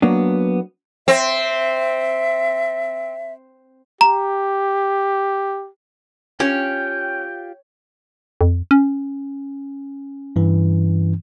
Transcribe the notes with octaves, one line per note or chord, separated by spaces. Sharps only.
F#3 A#3 B3 D4
C4 E5
G4 A#5
C#4 F4 G4 G5
F2
C#4
G2 E3